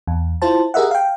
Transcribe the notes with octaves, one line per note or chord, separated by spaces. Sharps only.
E2
E4 F4 C5 A5
G4 G#4 A#4 D#5 E5 F#5
F5 G5